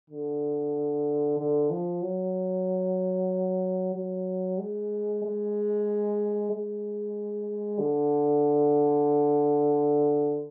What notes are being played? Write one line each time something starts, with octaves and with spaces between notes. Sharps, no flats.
D3
D3
F3
F#3
F#3
G#3
G#3
G#3
D3